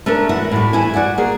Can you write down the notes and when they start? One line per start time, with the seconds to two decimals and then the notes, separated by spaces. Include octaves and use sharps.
0.06 A3 C#4 D4 A#4
0.29 E3 F#4 E5 F#5
0.52 A2 G3
0.73 E2 E4 E5 G#5
0.94 F#4 D5 F#5 G#5
1.18 A#3 G#4